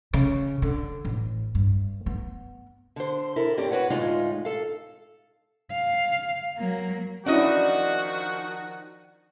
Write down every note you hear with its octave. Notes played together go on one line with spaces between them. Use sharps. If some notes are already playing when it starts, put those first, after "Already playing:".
C#3
D3
A1
G2
B3
D3 C5
E4 A4 A#4
G2 C4 C#4 G4 D5
F#4 A4 B4 C#5 F#5
D2 A2 G#3 D#4 F4 F5
A4 F5
F5
F#3 A#3
D#3 F3 C#4 D4 E4 F#4 D5 D#5